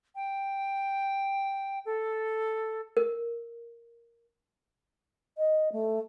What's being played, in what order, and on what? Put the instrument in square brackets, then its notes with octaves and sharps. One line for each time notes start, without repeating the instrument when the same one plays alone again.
[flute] G5
A4
[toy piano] A#4
[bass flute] D#5
A3